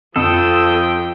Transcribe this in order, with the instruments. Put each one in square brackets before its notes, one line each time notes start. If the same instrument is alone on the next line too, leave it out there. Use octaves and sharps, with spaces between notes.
[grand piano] F2 [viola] F3 G5 [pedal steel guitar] A4 [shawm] D#6